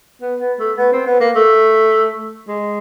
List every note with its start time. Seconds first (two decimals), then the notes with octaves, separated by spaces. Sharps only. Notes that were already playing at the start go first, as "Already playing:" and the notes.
0.22 B3
0.40 B3
0.59 A3
0.78 B3
0.92 C4
1.07 B3
1.20 A#3
1.36 A3
2.48 G#3